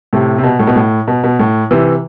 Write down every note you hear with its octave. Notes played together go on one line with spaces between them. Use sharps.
A2 C3
C3
B2
A2
B2
A2
B2
B2
A2
C3 E3